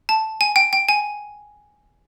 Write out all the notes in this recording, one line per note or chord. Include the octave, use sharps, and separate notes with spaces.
A5
G#5
G5
G5
G#5